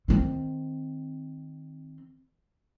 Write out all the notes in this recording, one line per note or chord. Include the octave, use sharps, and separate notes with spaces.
D#3 C4